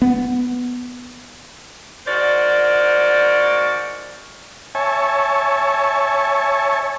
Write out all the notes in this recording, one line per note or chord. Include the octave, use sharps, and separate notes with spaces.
B3
G#2 F#4 A#4 C5 D5
C#5 E5 G#5 A5 C#6